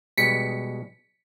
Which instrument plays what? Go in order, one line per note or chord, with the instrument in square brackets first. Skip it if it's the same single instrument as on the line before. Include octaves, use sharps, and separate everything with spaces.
[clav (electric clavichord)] B2 G3 G#3 [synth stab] B6 C#7